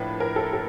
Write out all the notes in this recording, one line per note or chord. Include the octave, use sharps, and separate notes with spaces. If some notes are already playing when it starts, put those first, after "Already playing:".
Already playing: A2 F3 A#3 D4 B4
A#4
A4
A4